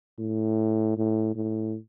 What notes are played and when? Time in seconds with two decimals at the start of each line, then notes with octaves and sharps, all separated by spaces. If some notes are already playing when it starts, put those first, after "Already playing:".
0.19 A2
0.97 A2
1.36 A2